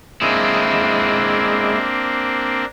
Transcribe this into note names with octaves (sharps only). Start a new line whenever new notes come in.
G#3 A#3 C4 D4 E4